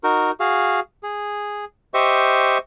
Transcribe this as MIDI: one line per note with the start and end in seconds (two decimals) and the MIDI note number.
0.04 0.31 63
0.04 0.31 66
0.04 0.31 70
0.40 0.80 66
0.40 0.80 68
0.40 0.80 77
1.03 1.65 68
1.94 2.58 67
1.94 2.58 72
1.94 2.58 75
1.94 2.58 76
1.94 2.58 85